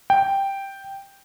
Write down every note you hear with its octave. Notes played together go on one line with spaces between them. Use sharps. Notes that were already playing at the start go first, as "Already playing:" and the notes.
G5